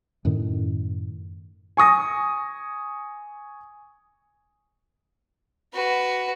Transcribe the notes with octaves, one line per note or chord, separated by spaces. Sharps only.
F#2 A2 D#3
G#5 C#6 D#6 A#6
F#4 B4